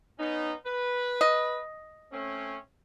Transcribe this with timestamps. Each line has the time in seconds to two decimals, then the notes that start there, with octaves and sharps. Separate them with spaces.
0.19 B3 C#4 D#4
0.66 B4
1.21 D#5
2.12 A3 C4 C#4